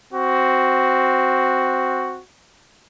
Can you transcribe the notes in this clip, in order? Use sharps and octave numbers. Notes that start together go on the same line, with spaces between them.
C4 F#4